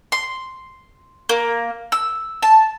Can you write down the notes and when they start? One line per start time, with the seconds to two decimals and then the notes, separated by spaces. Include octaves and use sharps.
0.12 C6
1.29 A#3
1.92 E6
2.43 A5